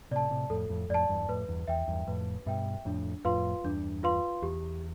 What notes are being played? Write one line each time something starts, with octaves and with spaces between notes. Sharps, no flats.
A2 C3 D5 A5
A2 C3
F2 A2 A4
F2 A2
F2 A2 D5 A5
E2 G2
G2
F2 A2 B4
E2 G2
E2 E5 G5
E2 G2
F2 A2 B4
G2 B2 E5 G5
F2 A2 D4
F2 A2 F4 B4 F5 C6
E2 G2 D4
F4 B4 F5 C6
E2 G4